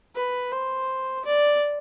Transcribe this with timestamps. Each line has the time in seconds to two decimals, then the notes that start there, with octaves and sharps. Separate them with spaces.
0.15 B4
0.52 C5
1.25 D5